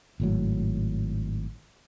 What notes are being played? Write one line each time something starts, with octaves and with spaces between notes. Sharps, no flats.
G#1 A2 F#3